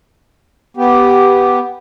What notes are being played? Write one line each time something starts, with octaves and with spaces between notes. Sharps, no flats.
B3 G4